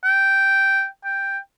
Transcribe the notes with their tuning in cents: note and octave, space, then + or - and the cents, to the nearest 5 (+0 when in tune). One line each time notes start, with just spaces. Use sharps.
G5 -5
G5 +5